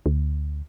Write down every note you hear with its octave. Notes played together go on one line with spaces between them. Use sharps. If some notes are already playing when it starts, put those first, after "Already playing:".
D2